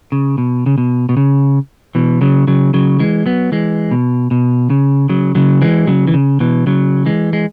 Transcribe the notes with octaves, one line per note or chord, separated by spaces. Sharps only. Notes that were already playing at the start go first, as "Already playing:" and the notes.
C#3
B2
C#3
B2
B2
C#3
B2 E3
C#3 F#3
C#3 F#3
C#3 F#3
E3 G#3
F#3 B3
E3 G#3
B2
B2
C#3
C#3 F#3
C#3 F#3
E3 G#3
C#3 F#3
E3
C#3
B2 E3
C#3 F#3
E3 G#3
G#3